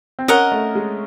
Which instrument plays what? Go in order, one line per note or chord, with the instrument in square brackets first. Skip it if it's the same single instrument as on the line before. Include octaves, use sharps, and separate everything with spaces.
[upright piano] C4
[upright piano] C#4 [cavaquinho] A#4 D#5 F#5
[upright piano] A3
G#3